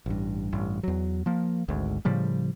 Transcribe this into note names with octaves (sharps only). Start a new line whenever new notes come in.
A1 G2
A1 G2
E2 F#3
F3 A#3
G#1 D2 G#2
A2 C#3 F3 G3